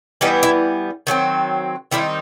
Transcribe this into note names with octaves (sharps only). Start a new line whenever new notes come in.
E3 G3 B3 D#4
E4
D#3 F#3 A3 C4
D#3 G3 C4 D#4 E4